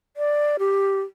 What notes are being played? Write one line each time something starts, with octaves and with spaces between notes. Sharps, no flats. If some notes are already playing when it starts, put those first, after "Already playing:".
D5
G4